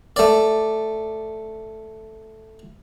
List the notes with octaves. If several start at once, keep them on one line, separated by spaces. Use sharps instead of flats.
A3 D5